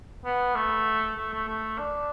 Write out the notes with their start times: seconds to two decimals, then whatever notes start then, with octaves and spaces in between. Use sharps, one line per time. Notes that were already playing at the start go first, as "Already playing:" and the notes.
0.25 B3
0.55 A3
1.17 A3
1.33 A3
1.48 A3
1.78 D4